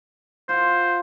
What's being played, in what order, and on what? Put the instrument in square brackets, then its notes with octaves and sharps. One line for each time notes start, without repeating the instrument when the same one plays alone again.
[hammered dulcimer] F4 F#5 [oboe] C5